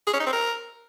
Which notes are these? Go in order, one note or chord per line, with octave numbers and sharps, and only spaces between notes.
G#4
C#4
D#4
C4
A#4